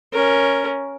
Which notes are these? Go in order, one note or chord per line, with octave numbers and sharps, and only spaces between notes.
C#4 A#4